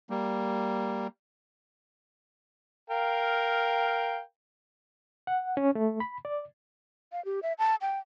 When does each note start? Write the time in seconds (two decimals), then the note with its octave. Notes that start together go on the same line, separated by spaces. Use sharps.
0.10 G3 A#3
2.90 A#4 F5 G5
5.27 F#5
5.57 C#4
5.75 A3
6.00 B5
6.25 D5
7.12 F5
7.25 G4
7.43 E5
7.59 A5
7.81 G5